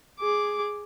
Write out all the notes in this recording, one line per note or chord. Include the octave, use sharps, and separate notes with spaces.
G#4 D6